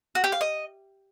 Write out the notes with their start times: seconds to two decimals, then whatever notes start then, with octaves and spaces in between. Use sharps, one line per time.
0.15 F#4
0.24 G4
0.32 F5
0.41 D#5